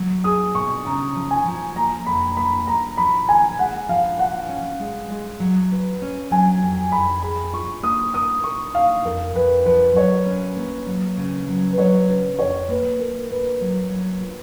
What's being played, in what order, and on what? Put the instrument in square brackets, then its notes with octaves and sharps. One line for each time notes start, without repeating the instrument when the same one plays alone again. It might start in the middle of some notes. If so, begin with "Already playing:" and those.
Already playing: [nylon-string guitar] F#3
[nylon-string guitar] G#4 [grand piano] D#6
[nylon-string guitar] B2 [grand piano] C#6
[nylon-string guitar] C#3 [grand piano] A#5
[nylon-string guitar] F3
[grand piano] G#5
[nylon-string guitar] F3
[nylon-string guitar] A#3 [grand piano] A#5
[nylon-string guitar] F2 [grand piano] B5
[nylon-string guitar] A#3 [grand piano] B5
[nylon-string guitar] A#3 [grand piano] A#5
[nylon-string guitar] F3 [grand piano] B5
[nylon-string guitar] D#2 [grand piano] G#5
[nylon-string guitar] G#3 [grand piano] F#5
[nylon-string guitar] F3 [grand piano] F5
[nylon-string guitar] F#4 [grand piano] F#5
[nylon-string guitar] C#4
G#3
G#3
F#3
B4
C#4
[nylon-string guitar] F#3 [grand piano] G#5
[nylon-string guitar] F2
[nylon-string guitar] F2 [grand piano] B5
[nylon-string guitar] G#4 [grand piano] B5
[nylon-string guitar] F4 [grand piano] C#6
[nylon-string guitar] A#3 [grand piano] D#6
[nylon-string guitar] A#4 [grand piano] D#6
[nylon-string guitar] A#4 [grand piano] C#6
[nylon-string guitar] D#4 [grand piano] F5
[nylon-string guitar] F2 [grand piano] A#4
[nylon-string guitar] F2 [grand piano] B4
[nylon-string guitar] F3 [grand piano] B4
[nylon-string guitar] F#3 [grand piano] C#5
[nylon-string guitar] C#4
A#3
F#3
C#3
F#3
[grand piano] B4
[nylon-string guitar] F#3 [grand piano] C#5
[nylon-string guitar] C#3 [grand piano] B4
[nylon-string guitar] F2 [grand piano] C#5
[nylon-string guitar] A#3 [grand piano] B4
[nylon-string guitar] A#3 [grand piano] A#4
[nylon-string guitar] A#3 [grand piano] B4
[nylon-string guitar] F#3
F#3
F4